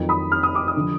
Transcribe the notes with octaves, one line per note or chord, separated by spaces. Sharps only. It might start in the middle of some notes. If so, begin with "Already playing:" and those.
Already playing: F2 D#3 F#3
B5 D#6
F6
D#6
D6
B5 D#6
D3 F3